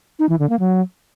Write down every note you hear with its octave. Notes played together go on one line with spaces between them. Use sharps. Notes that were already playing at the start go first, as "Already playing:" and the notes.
D#4
E3
D3
A#3
F#3